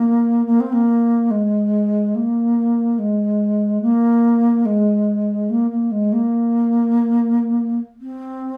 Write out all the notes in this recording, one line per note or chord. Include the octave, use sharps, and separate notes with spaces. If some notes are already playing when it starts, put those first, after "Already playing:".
Already playing: A#3
A#3
C4
A#3
G#3
A#3
G#3
A#3
G#3
A#3
A#3
G#3
A#3
C4